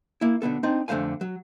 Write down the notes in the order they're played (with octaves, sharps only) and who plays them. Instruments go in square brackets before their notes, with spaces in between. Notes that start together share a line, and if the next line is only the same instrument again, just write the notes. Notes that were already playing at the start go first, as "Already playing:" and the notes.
[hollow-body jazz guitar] A#3 E4
B1 D3 B3 A4
C4 D4 D#4
F2 D3 A3 C5 F5 G#5
F#3